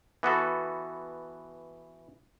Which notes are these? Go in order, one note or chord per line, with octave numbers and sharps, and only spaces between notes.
E3 B3 F#4 A4